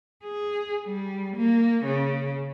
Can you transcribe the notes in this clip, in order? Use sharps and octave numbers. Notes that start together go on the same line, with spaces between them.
G#4
G3
A#3
C#3